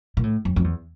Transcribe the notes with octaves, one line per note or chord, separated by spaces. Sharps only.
A#2
A2
F2
F2
E2